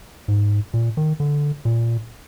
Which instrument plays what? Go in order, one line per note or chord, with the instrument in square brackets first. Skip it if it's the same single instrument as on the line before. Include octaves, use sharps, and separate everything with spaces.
[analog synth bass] G#2
A#2
D#3
D3
A#2